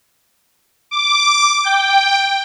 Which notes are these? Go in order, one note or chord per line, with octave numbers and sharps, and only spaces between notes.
D6
G5